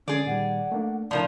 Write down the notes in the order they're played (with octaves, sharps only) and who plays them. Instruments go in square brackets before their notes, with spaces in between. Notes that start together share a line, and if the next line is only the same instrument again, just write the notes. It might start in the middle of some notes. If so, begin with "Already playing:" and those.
[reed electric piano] D3 G#3 [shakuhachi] C#4 [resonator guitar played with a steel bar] G#4 D5
[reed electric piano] A#2 D#3 G3 [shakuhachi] F#5
[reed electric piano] A3 A#3 D4
[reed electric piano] C2 C#3 A#4 [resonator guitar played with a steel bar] A2 F3 D#4 [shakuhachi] D5